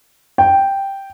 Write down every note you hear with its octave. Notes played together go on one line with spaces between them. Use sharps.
G5